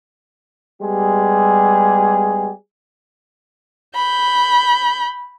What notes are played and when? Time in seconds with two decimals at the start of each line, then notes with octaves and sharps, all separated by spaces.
0.81 G3 G#3 B3 G4 G#4
3.95 B5 G6